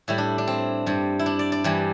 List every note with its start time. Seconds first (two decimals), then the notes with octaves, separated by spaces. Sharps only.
0.08 A2 G3 E4
0.18 D4
0.38 D4
0.47 C4
0.86 G2 G3
1.19 E4
1.26 D4
1.39 D5
1.52 D5
1.64 G2 E3 G3